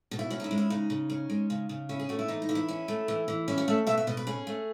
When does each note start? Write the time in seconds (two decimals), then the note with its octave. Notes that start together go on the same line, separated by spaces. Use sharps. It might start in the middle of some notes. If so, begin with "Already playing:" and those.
0.11 B2
0.19 E4
0.31 C#4 F#4
0.40 D#4
0.44 E4
0.51 G#3
0.58 E4
0.70 C#3 D#4
0.90 C#3
1.10 C#4
1.30 G#3
1.50 C#3
1.69 C#3
1.89 C#4 E4
1.99 G#4
2.09 A3 F#4
2.19 E4
2.28 E3 D#4
2.42 D#4
2.49 E3
2.55 E4
2.69 C#4
2.88 A3
3.08 E3
3.28 E3
3.48 C#4 E4
3.58 F#4
3.68 A3 E5
3.87 B2 E5
3.98 E5
4.07 B2 D#5
4.17 B4
4.27 C#4 G#4
4.47 A3